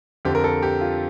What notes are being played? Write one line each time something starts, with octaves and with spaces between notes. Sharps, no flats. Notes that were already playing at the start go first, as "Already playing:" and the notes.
F2 D3 G4
A#4
A4
G4
F4